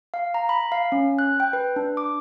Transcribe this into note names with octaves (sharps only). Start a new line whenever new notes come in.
F5
A#5
B5
F5
C#4
F#6
G5
B4
D4
D6